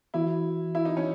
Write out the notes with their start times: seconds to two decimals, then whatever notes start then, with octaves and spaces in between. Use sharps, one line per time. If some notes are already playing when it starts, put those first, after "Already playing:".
0.14 E3 B3 E4 F#4
0.75 E4
0.85 D#4
0.97 C#4